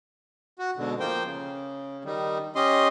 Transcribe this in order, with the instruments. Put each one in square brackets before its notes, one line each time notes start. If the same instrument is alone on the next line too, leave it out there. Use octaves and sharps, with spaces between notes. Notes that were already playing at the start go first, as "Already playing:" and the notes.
[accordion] F#4
G#2 B2 D3
F3 A#3 C5 G5
C#3
D#3 G3
C#4 G4 D#5 C6